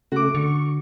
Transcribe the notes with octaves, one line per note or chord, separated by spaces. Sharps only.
C#3 A3 F#4 D6
D3 C#6